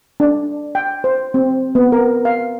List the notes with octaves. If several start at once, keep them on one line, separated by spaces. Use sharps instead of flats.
D4
G5
C5
C4
B3
A#4
F5